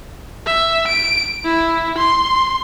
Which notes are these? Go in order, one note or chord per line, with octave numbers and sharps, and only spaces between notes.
E5
D7
E4
C6